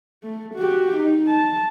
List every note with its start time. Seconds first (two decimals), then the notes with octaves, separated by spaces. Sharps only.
0.24 A3
0.55 F#4 G4
0.98 D#4
1.27 A5